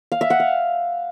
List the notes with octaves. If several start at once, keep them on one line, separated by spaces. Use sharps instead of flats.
F5
E5
F#5
F5